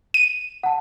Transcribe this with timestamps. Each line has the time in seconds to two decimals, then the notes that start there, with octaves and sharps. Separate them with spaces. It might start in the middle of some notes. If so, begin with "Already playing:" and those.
0.14 D#7
0.63 F#5 A5